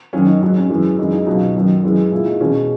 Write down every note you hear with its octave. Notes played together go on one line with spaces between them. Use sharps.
F#2 D#3 F#3 C#4
D#4
G#2 F#3 D#4
C#4
F#2 E3 G#3
F#2 E3 G#3 D#4
D#4
C#2 B2 F#3 D#4
F#2 D#3 F#3
F#2 E3 G#3
A#2 G#3 E4
D#4
E2 B2 G#3 C#4